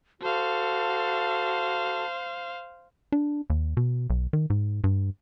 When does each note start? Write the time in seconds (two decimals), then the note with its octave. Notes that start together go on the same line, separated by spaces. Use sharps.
0.22 F#4 A4 C5 F5 A5
3.12 D4
3.50 D#2
3.77 B2
4.10 B1
4.33 D#3
4.50 G#2
4.84 G2